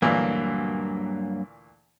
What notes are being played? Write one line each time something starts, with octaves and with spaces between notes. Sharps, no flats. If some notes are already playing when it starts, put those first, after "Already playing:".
D2 G2 A#2 E3 F#3 A#3